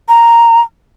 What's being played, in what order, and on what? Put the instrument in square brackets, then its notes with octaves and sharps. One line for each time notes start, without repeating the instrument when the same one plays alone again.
[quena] A#5